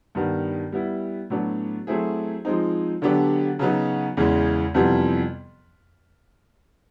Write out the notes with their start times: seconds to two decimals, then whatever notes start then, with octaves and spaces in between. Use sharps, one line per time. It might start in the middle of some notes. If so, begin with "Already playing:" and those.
0.15 G2 D#3 G3 B3
0.72 G3 B3 E4
1.30 A2 F#3 B3 D4
1.87 F#3 A3 C4 E4 G#4
2.45 F3 G#3 C4 D#4
3.02 D3 F#3 B3 D4 G4
3.59 C#3 F#3 B3 D#4 F#4
4.17 E2 C#3 E3 G#3
4.74 F2 C3 E3 G3 B3